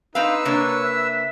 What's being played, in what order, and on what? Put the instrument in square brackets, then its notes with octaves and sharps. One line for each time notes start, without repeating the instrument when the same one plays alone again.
[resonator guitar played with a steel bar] C4 F5 [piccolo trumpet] D#4 [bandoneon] B4 E6
[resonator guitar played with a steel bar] C3 A#3 D4 [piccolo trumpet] C#5
[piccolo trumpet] E5